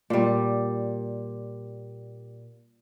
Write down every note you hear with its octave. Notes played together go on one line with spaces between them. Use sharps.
A#2 G3